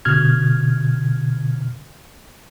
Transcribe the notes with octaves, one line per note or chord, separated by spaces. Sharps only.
B2 D3 F6 G#6